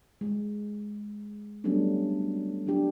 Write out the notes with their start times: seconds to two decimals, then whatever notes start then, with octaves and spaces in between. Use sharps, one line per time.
0.21 G#3
1.64 F#3 G3 A3 B3 C#4 D4
2.67 F#3 D4 G4